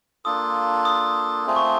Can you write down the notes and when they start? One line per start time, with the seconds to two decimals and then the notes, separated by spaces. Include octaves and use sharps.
0.25 A#3 D4 F4 A4 D#6
0.85 D#6
1.46 A3 C4 F4 G#4
1.56 C#6